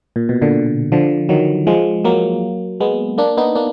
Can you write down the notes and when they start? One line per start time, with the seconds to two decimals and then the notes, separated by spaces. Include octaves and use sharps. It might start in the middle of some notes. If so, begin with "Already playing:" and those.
0.16 A#2
0.29 B2
0.42 A#2 D3
0.92 D3 F3
1.29 D#3 F#3
1.67 F3 G#3
2.04 F#3 A#3
2.80 G#3 B3
3.18 A#3 D4
3.37 B3 D#4
3.55 A#3 D4